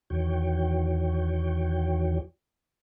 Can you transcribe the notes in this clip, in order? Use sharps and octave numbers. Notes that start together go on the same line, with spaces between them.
E2 D#3 E3 F#4 C#5 G5